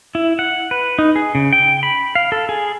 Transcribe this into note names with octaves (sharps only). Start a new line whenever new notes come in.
E4
F#5
B4
D#4
G#4
C#3
G5
B5
F5
A4
G#4